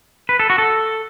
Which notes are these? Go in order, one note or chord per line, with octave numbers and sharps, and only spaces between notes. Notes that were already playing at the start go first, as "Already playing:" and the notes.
B4
A4
F#4
A4